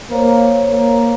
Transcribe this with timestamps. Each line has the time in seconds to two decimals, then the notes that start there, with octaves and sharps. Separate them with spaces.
0.11 A#3 C5 C#5
0.71 A#3